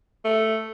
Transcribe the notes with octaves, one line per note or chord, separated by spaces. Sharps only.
A3